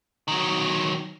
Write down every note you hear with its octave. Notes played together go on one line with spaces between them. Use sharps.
D#3 F#3